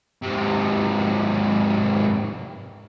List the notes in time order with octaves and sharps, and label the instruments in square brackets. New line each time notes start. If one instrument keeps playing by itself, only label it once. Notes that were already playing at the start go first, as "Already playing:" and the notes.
[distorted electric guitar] G#2 C3